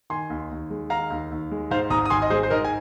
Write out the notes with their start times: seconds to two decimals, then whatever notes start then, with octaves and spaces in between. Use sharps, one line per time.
0.10 D#3 G#5 C6
0.30 D#2
0.51 D#2
0.70 G#3
0.90 D#3 F5 A#5
1.10 D#2
1.31 D#2
1.51 G#3
1.71 G#2 C5 F5
1.90 G#1 A#5 D#6
2.06 D#6
2.10 G#1 G#5 C6
2.22 D#5
2.30 G#3 G#4 C5
2.43 C5
2.50 G#2 A#4 D#5
2.65 G#5